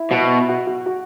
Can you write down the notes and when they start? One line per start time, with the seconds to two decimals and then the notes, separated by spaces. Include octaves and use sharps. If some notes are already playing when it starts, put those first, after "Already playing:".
Already playing: E4
0.11 B2
0.49 F#4
0.67 F#4
0.86 F#4